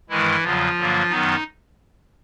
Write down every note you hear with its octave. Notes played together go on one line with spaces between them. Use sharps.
G2 D#3 E3 G#3 E4
E2 C#3 F3 F#3 F4
G2 D3 F#3 A#3
F#2 D#3 F#3 B3 D#4